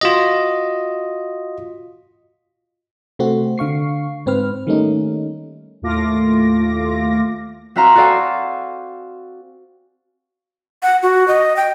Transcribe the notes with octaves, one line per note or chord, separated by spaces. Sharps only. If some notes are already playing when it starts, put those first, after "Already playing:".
F4 F#4 D#5
C3 A3 C4 F#4
D3 F5 C#6 C7
G#2 C4 B4 F6
D#3 G3 A3 A#3 C#4 D#4
D#2 A2 A3 F4 D6 A#6
C4 F#4 E5 F5 A#5 C6
F#4 A4 D5 F5 G5 G#5
F#5
F#4
D#5
G5